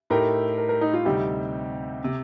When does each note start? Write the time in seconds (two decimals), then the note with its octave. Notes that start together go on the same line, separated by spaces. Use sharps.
0.10 A2 A3 D#4 G4 A#4
0.58 A#4
0.69 A#4
0.81 D#4
0.94 F4
1.05 D2 C3 G3 C4 D#4 G4
2.04 C3